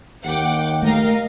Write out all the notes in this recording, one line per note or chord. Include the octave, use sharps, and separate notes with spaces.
D#2 F#5 G5 D6
A3 A#4 D#5 F5